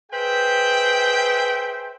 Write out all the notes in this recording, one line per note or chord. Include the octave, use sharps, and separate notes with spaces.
G#4 B4 C5 E5 G5